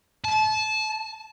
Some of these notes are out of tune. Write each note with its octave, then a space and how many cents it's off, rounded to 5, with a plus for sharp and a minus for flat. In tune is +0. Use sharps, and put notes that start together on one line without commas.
A5 -25